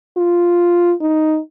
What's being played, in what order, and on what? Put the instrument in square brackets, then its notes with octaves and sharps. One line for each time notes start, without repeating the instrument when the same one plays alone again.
[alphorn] F4
D#4